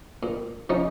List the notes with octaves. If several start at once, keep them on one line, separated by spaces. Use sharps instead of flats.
A#2
F3 C#4 D#4 C#6